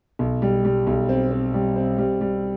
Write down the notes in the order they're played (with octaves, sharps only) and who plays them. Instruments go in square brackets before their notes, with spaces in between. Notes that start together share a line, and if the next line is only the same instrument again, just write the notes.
[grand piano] B1
G3
G3
B1
C4
C4
G3
C4
G3
G3